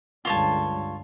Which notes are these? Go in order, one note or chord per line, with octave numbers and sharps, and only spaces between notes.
C#2 G2 D3 F4 C#5 A5